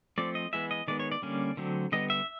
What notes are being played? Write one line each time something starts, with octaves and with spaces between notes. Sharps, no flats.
F3 A3 C4 D5
D#5
E3 G#3 B3 E5
D#5
D#3 G#3 B3 D5
C#5
D5
D3 G3 A#3 C#4
D3 F#3 A3 C4
D3 G3 B3 D#5
E5